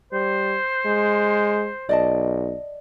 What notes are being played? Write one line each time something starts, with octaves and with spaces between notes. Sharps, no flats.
G3 C5
G#3
B1 D5 D#5 A5